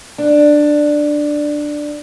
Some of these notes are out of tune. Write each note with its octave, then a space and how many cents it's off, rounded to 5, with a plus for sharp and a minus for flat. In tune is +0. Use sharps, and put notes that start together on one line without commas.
D4 +10